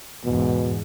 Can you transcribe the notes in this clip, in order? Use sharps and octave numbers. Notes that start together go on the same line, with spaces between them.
E2 G#2 B2